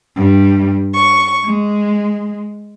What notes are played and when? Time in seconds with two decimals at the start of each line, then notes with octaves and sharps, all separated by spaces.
0.17 G2
0.94 C#6
1.46 G#3